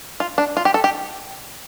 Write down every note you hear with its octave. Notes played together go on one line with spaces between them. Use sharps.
F4
D4
F4
G4
A4
G4